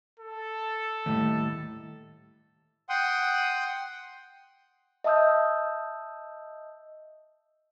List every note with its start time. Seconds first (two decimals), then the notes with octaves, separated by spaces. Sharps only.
0.20 A4
1.06 D#2 A2 G3
2.89 F#5 G5 C6 D#6
5.04 D#5 E5 A5 D#6 E6 G6